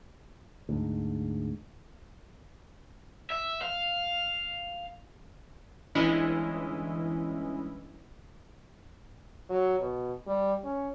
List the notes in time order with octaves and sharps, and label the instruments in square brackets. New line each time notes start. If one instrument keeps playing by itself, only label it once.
[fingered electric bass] D2 G#2
[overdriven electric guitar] E5
F5
[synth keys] G1 E3 G#3 C#4 E4 D#5
[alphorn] F#3
B2
G3
C#4